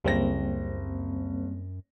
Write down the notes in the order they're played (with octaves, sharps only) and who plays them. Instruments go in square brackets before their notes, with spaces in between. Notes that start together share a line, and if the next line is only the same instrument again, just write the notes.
[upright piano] F#1 A#6 [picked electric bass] C#2 [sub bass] F#2 [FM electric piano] G3 A#3 C4